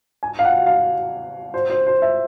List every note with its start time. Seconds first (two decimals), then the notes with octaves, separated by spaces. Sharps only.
0.23 G#5
0.39 F5
0.45 F#5
0.66 F5
1.54 C5
1.70 C5
1.87 C5
2.02 E5